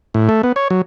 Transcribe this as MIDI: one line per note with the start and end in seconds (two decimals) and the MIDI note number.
0.14 0.29 45
0.29 0.42 57
0.43 0.52 59
0.56 0.68 73
0.70 0.82 54